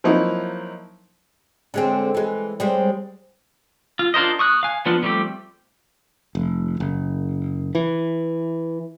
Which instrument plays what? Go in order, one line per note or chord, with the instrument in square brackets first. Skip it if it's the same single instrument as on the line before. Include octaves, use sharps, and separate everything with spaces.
[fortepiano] F3 F#3 A#3 C4 D#4 E4
[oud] D3 G#3 C4
E3 G#3
G3 G#3 C4
[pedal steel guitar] F4
D4 F4 A#4 C5 D#5
C#6 D#6 F#6
F5 G#5
F3 B3 D4 F4
F3 G3 A3 C4 G4
[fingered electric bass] F1
F#1
E3